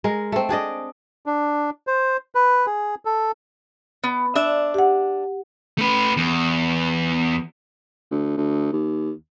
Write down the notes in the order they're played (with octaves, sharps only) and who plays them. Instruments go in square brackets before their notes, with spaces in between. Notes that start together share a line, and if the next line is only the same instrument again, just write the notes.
[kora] G#3 A#4
A3 C4
D4 G#4 D5 D#5
[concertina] D4
C5
B4
G#4
A4
[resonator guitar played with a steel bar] B3
D4 E5
[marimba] G4 F#5
[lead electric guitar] A3 B4
E2
[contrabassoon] D2
D2
D#2